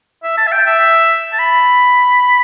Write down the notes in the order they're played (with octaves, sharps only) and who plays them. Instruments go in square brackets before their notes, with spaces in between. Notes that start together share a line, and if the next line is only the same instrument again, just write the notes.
[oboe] E5
A5
E5
G5
E5
A5
B5